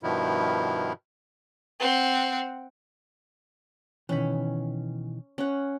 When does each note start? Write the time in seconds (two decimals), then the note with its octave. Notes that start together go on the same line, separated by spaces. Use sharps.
0.03 G2 B2 D#3 F3 E4
1.80 C4 F#5
4.09 B2 D#3 E3 C#4 B5
5.38 C#4 F#5